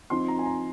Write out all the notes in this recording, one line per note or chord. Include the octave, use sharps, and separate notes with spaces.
F3 C4 D#4 C6
A#5
G#5
A#5